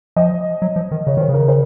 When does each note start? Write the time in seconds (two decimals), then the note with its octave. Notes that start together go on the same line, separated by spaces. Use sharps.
0.16 F3 D#5
0.62 F#3
0.76 F3
0.91 D#3
1.07 C#3 C#5
1.17 D#3 C5
1.29 C#3
1.34 A#4
1.48 C5